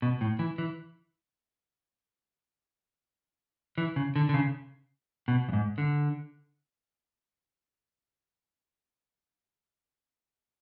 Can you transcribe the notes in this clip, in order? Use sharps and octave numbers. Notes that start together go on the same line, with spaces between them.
B2
A2
E3
E3
E3
C#3
D3
D3
C#3
B2
F#2
G#2
D3